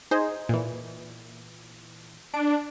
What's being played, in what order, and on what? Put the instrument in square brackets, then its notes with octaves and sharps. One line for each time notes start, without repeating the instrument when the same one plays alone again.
[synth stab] D#4 G#4 C5
A#2 E3
[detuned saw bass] D4 [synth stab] D7